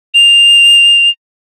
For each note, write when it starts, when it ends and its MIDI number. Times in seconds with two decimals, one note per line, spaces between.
0.14 1.09 101